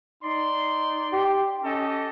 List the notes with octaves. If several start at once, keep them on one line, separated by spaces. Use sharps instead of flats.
D#4 D5 C6
G4
C#4 G4 A4 D#5